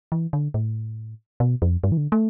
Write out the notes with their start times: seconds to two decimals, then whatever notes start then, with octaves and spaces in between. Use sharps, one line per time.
0.12 E3
0.33 D3
0.54 A2
1.40 B2
1.62 F2
1.84 G2
1.92 E3
1.97 D3
2.12 A3